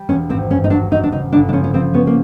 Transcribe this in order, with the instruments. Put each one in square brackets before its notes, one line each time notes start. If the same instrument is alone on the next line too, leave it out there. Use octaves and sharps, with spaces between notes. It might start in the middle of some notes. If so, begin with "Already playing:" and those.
Already playing: [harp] G3
[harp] E1 [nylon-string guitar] C#4
[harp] G#1 [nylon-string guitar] C4
[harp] G2 [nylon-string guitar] C#4
[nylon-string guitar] D#4
[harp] F#3 [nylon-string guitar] D4
[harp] F#3 [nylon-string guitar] D#4
[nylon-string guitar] D4
[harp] C#3 [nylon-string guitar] D#4
[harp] G1 [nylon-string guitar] D4
[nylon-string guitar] D4
[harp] F3 [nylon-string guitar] C#4
[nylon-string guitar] C#4
[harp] F3 [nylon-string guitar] C4
[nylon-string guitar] B3 [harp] C#4
[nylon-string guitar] A#3